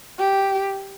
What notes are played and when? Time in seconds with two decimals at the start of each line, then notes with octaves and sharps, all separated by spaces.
0.18 G4